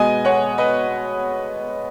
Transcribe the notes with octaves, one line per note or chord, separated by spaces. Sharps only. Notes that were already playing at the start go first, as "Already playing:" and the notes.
Already playing: B2 G#3 B3 D#5 G#5
C#5 F#5
B4 D#5